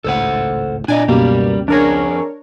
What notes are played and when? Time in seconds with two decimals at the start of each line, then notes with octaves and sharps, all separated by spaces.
0.04 G#1 C#2 A2 A4 C5 F#5
0.88 A#2 D4 D5 D#5 G#5
1.08 C#2 F#2 B2 G3 A#3 C#4 G4
1.68 F2 D4 G#4 A#4 C#5